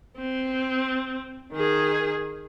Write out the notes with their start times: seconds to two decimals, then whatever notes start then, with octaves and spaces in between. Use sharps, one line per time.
0.17 C4
1.52 D#3 G#4